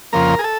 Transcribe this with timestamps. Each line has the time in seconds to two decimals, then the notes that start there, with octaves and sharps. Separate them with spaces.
0.13 F2 C#3 F3 A#3 A#4
0.39 G#4
0.44 A4